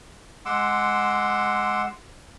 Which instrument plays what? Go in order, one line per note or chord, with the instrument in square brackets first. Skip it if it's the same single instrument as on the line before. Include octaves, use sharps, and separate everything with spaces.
[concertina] G#3 F#5 C6 D6 E6